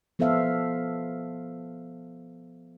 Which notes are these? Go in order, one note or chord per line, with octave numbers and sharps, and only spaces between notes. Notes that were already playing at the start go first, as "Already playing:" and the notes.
F3 B3 A4 C5 E5 F5